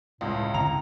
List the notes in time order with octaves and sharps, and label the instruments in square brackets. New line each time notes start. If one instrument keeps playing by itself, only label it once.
[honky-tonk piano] C#2 [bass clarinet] A2
[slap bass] D3 C4 C#4 [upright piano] A#5 [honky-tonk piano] F7